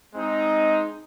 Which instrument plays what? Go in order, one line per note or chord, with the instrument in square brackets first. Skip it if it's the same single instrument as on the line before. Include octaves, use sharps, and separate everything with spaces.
[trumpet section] G#3 C4 D#4